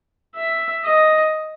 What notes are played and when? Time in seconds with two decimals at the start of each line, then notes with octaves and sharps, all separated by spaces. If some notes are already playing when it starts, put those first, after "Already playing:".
0.36 E5
0.85 D#5